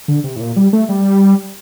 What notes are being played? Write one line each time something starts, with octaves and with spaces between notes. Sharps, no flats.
D3
C3
A2
A#2
G3
A3
G3